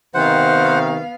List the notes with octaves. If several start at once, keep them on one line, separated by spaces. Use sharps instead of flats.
C3 D#3 B3 C5 F5 F#5